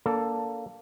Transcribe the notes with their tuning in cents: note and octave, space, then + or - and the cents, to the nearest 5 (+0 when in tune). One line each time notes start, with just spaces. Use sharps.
A#3 +5 D4 -35 A4 +10